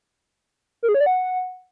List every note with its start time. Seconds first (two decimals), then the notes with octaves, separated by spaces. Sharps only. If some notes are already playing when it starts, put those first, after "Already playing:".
0.83 A#4
0.89 G#4
0.94 C#5
1.00 D5
1.06 F#5